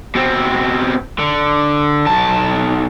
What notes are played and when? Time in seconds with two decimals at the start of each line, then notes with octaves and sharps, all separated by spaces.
0.16 B2 C4
1.19 D3
2.07 B1 A5